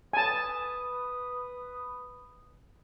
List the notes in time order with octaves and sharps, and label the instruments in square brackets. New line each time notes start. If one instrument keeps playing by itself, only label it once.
[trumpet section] B4 D#6 [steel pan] G#5 A5